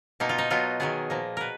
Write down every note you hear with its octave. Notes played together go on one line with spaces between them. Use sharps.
B2 A#3 D#4
F4
D#4
B2 F#3 B3 F4
D#3 F#3 B3 G#4
A#2 F3 A#3
B2 A#4 B4